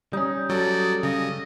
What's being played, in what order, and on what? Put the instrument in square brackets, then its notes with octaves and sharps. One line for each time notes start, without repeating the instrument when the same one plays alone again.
[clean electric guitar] G3 C#4 [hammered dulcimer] D#4
[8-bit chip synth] F#3 [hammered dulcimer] A4 [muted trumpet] D5
[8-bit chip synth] C#3 [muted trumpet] D#5